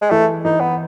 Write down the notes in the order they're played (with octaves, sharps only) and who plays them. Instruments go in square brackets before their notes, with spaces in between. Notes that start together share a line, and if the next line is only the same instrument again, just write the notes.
[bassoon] G#3
[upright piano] E3 [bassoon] A3
[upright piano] E3 [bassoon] D#4
[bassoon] B3